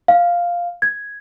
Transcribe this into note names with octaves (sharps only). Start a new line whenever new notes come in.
F5
G#6